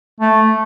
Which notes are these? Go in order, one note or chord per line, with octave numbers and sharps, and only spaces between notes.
A3